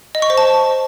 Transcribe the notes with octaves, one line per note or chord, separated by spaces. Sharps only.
D#5
C#6
C5
A5